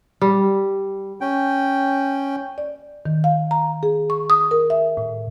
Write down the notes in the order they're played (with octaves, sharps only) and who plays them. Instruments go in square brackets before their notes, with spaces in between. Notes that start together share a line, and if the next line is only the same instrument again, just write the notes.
[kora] G3
[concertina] C#4 G5
[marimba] D5
D#3
F5
A#5
G#4
C#6
D#6
A#4
E5
A2